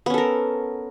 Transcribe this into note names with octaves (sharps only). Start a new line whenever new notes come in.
B3 C#4 A4 A#4